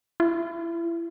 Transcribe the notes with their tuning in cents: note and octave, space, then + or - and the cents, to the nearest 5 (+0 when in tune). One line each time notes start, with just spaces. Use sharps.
E4 +30